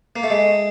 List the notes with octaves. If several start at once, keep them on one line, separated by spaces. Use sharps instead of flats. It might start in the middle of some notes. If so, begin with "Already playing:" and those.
A#3
A3
G#3